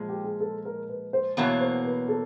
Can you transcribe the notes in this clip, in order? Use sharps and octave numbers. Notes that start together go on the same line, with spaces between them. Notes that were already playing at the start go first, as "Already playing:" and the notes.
Already playing: A#2 F3 G#3
G4
G#4
A4
A#4
B4
C5
E2 B2 F#3 A#3 C#5
C5
B4
A4